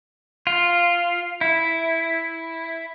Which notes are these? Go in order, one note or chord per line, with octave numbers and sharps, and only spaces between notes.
F4
E4